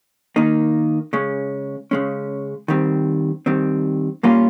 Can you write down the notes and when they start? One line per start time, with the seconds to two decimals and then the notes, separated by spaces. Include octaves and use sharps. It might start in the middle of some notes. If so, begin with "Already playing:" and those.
0.36 D#3 A#3 D#4
1.13 C#3 G#3 C#4
1.91 C#3 G#3 C#4
2.68 D#3 G3 C4
3.46 D#3 G3 C4
4.23 A#2 G3 A#3 C#4 F4